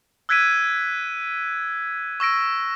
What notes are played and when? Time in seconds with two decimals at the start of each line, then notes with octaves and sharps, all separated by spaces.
0.29 E6 F#6 G#6 B6 D7 D#7
2.20 C#6 E6 A#6 D7